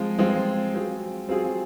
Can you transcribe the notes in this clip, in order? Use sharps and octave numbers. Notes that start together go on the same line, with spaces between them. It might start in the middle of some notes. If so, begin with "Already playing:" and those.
Already playing: F3 G#3 C4 F4
F3 G#3 C4 F4
F#3 C4 F4 G#4
F#3 C4 F4 G#4